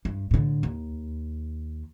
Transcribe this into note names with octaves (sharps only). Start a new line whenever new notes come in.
G2
A2 D3
D#2